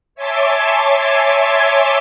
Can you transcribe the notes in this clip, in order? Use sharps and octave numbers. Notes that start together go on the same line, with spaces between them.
C#5 E5 G#5 A5 C6 D6